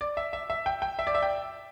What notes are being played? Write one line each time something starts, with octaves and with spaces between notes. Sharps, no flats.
D5
E5
E5
E5
G5
G5
E5
D5
E5
G5